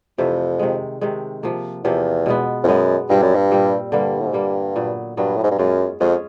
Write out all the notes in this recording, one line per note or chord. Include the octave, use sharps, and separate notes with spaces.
F2 C3 E3 A3
C3 D#3 G#3
C3 D#3 G#3
C3 F3 A#3
E2 C3 F3 A#3
B2 G#3 B3
F2
F#2 B2 G#3 B3
G2 A#2 G3 C4
F#2
G2
A#2 G3 C4
G2 D3 G3 A#3
A2
G#2
G2 D3 G3 A#3
A#2 F#3 B3
G2 A#2 F#3 B3
A2
G#2
G2
F#2 G#3 C#4 F4 G#4
F2 G#3 C#4 F4 G#4